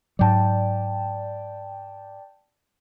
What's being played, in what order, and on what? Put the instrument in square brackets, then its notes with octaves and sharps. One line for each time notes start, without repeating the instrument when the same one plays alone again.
[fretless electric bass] G#2 F#3 [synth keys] D5 G5 A5